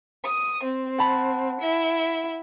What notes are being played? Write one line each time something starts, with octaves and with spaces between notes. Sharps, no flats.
D#6
C4
F#5 A5 B5
E4